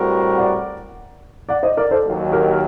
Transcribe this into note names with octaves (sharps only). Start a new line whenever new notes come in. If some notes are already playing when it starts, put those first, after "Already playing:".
Already playing: A2 G3 C4 F#4 A#4
D5 F#5
D5 F#5
C5 D#5
A#4 D5
A4 C5
D#2 D#3 F#3
G4 A#4